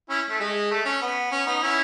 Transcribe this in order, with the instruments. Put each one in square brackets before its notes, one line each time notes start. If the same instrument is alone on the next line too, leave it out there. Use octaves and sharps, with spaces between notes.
[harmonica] C#4 E4
A3
G#3
A3
C#4
B3
C#4
B3 D#4
C#4 E4